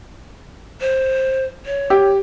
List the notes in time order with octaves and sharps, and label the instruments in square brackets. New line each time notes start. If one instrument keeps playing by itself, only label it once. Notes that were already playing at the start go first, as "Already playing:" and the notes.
[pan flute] C5
C#5
[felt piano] G4